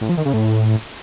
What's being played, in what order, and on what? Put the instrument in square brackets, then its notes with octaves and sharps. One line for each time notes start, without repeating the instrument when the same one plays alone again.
[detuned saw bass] A2
F3
D#3
C#3
A2